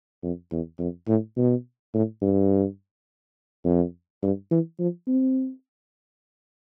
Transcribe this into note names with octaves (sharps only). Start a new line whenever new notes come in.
F2
E2
F2
A2
B2
A2
G2
F2
G2
E3
F3
C4